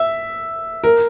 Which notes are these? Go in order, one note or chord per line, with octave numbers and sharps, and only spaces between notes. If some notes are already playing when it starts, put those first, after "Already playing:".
Already playing: E5
A#4